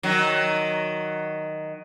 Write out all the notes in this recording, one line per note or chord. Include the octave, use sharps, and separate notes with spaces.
D#3 F#3